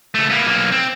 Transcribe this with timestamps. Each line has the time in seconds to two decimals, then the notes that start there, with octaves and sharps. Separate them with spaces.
0.15 C#2 A3
0.30 A#3 B3
0.47 B1 A#3
0.72 C4